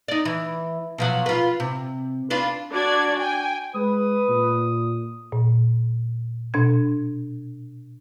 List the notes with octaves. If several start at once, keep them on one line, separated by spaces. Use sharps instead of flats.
D#4 D5
E3
B2 F3 F#3
F4 B4
C3
D4 F4 B4
D4 F#4 D5 G#6
G5 G#5
G#3 B4 D#6
A#2
A#2
B2 D4 G#6